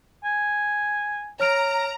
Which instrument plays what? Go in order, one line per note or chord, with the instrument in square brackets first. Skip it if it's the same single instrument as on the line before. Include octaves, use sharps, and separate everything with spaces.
[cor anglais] G#5
[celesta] C#5 F6 D7 [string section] A#5